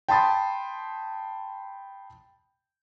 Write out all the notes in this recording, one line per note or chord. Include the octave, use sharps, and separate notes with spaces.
G5 A5 B5 C6 D#6 A6